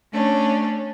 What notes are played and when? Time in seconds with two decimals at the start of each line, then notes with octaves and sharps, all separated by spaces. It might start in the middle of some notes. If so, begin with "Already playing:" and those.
0.11 A3 C#4 D4